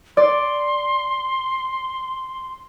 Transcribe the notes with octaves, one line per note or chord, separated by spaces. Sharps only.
D5 C6